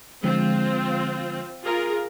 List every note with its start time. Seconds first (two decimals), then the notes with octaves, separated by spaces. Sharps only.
0.23 D3 F3 G#3 C4 F4
1.64 F4 G#4 A#4